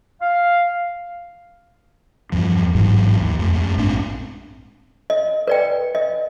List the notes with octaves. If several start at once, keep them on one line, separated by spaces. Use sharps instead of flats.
F5
E2 G2 F3
A1 G#2 E3 F#3
D#2
F2 A3
F#2 A3
A#1 G#2 C4 D4
D#5
B4 D5 G5
D#5